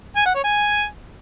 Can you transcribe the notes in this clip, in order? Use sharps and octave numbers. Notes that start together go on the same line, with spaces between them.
G#5
F#5
C#5
G#5